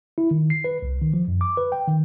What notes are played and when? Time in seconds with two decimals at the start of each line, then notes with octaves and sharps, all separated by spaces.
0.18 E4
0.31 D#3
0.50 C7
0.64 B4
0.82 C2
1.01 D#3
1.14 F3
1.28 F#2
1.41 D6
1.57 B4
1.72 G5
1.88 D#3